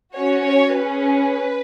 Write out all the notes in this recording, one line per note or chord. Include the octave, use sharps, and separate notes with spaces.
C#4 F#4 C#5
C#5
C#4 G#4 B4